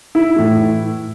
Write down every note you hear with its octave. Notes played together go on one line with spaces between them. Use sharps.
E4
A2 E3